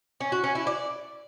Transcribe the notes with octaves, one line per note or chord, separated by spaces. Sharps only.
C#4
F#4
C#4
E4
D5